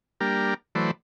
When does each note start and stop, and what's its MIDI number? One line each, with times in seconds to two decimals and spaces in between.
0.21 0.54 55
0.21 0.54 58
0.21 0.54 62
0.21 0.54 67
0.21 0.54 70
0.75 0.91 52
0.75 0.91 54
0.75 0.91 57
0.75 0.91 71
0.75 0.91 72
0.75 0.91 74